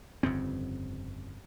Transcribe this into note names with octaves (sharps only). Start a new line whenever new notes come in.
G1 F2 C#3 C4